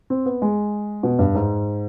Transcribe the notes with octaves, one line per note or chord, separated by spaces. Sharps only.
C4
B3
G#3
B2
G2
G#2